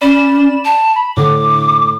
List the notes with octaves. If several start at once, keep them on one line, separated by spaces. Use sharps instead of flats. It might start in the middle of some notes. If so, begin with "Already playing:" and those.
C#4 D5 B5 E7
A5
B5
A2 D3 D6